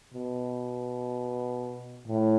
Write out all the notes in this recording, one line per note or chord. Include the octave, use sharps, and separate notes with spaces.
B2
A2